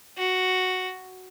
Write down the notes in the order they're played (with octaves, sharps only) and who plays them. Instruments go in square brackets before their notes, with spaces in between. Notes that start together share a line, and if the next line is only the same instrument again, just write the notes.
[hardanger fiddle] F#4